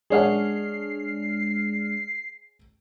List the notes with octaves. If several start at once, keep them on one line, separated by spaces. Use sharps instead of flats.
G#3 D4 G#4 C#5 F#5 F6 C7